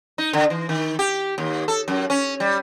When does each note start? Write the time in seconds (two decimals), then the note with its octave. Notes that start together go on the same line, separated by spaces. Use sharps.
0.18 D#4
0.33 D3
0.50 E3
0.69 D#3
0.99 G4
1.38 D#2
1.68 A4
1.88 F#2
2.10 C#4
2.40 G3